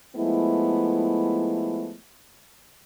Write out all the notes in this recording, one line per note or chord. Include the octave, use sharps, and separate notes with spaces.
F3 G#3 A3 B3 E4